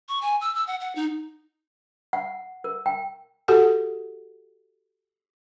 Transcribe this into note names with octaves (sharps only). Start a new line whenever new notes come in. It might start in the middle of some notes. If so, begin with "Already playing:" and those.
C#6
G#5
E6
E6
F#5
F#5
D#4
F#5
A#4
G5
F#4 G4 A4 F#5